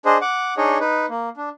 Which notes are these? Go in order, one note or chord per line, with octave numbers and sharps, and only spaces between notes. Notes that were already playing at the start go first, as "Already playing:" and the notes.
D4 G#4 C5 D#5
F#5 D6
D4 D#4 G#4 C#5 D#5
D#4 B4
A#3
D4